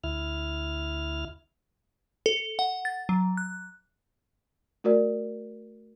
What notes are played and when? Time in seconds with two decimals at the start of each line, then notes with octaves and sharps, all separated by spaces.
0.04 D2 E4 F6
2.26 A4
2.59 F#5
2.85 A6
3.09 F#3
3.37 F#6
4.84 A3 F#4 A#4 D5